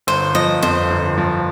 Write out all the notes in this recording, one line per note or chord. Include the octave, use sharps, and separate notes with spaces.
G1 C5
F3 D#5
F2 C5
G1
F3